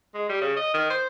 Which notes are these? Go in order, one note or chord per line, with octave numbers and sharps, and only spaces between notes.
G#3
G3
C#3
D#5
D#3
C5